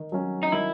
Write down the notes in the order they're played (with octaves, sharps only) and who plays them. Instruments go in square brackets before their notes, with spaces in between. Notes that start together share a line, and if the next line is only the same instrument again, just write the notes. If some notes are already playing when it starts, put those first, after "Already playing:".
Already playing: [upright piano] D#3
F#3 C#4
[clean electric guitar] D#4
[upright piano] D#3 [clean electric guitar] E4